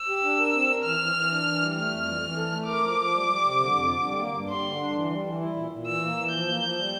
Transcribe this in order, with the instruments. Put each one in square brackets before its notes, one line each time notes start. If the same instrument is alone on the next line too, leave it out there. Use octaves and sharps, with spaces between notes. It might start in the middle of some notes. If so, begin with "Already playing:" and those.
Already playing: [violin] E6
[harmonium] G4
D4
A#4
C4
A#4
[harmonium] E3 [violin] F6
[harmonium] E3
E3
D4
E3
G3
[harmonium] A3 [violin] F6
[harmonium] F2
E3
E3
A4
A3
[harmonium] A#4 [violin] D6
[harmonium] F3
F3
G3
G3
C3
D3
F2
D3
G3
A#3
G2
[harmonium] G3 [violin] C6
[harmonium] D3
D4
E3
G3
E3
E4
A#2
A#2
[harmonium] E3 [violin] E6
[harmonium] A#3
E3
[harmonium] F3 [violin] G6
[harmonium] A#3
F3
G3